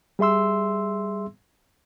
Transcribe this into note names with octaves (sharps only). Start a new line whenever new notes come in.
G3 G#4 E5 C6 E6